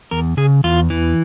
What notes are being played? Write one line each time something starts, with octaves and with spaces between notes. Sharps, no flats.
E2 A#4
C#3 G#4
E2 F4
E3